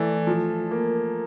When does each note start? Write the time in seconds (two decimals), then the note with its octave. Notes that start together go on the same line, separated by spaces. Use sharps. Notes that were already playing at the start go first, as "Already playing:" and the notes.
Already playing: E3 A3 D5
0.27 F3
0.71 A#3